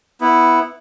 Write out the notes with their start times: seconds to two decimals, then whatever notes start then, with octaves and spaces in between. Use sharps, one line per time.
0.21 B3 E4